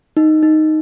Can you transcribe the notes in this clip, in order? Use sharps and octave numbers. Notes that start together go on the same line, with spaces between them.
D#4
D#4